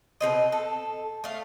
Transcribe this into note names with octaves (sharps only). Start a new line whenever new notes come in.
B2 G3 C4 D#5
A4
A3 F5